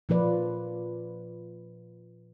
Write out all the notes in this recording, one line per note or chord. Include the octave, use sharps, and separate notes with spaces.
A#2 F3 F4 B4 D5